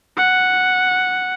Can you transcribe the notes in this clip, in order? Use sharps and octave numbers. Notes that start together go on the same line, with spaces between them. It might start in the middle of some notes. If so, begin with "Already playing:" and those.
F#5